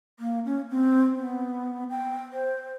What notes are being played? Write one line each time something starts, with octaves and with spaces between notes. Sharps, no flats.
A#3
C#4
C4
B3
G5
C5